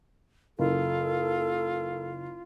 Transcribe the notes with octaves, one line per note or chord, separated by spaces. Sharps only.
F#1 F4 A4